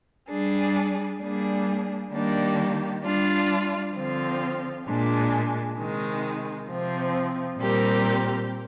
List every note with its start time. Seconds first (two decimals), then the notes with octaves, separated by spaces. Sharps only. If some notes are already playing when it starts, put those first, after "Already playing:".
0.30 G3 D4 G#4
1.21 G3 A#3 D4 G#4
2.12 D#3 G3 A#3 D4 G4
3.03 G3 D4 F4
3.94 D3 F3 C4 F4
4.85 A#2 G#3 D4
5.76 C3 D#3 G#3
6.67 C3 F3 C4
7.59 A#2 G3 C4 G4 A#4